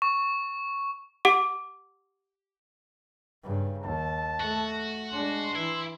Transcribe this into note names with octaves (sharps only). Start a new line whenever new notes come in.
C#6
G4 F#5 D6
G2 C#3
D#2 A5
A3 F#4
G#3 D4 C6
E3 E4